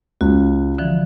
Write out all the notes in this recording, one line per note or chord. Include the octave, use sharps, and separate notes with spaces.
C#2 F#4
D3 E3 F3